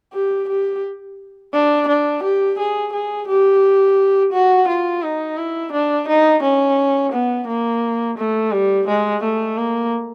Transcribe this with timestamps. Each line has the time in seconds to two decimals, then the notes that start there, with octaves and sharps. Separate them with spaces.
0.14 G4
0.49 G4
1.54 D4
1.88 D4
2.23 G4
2.59 G#4
2.93 G#4
3.28 G4
4.33 F#4
4.68 F4
5.03 D#4
5.37 E4
5.73 D4
6.08 D#4
6.43 C#4
7.13 B3
7.48 A#3
8.18 A3
8.52 G3
8.88 G#3
9.23 A3
9.57 A#3